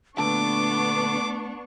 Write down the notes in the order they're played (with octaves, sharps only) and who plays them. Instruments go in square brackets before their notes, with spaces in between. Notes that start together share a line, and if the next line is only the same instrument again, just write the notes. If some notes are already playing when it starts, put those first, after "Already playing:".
[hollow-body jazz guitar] A#2 D3 A5 [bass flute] A3 [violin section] B3 D4 C#6 [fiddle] D6